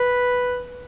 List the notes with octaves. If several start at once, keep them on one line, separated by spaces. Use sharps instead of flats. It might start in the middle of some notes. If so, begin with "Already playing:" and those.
Already playing: B4